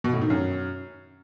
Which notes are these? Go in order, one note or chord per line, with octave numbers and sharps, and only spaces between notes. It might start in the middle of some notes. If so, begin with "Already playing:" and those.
B2
A2
D#3
F#2